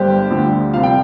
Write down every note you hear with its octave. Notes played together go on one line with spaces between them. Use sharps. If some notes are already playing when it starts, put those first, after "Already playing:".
Already playing: G1 G2 G3 G4 C5
D2 D3 F3
C2 C3 F3 F5
G5